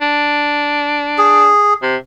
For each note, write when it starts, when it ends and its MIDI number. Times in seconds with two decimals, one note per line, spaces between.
0.01 1.50 62
1.18 1.74 68
1.82 1.96 48